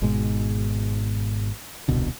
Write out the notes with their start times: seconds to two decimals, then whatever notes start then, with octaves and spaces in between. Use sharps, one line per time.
0.02 G#1 G#2 B2 G#3
1.88 D#1 C2 B2 D3